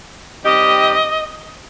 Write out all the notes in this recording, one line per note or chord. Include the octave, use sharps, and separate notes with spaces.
D#3 G3 C4 G4 D#5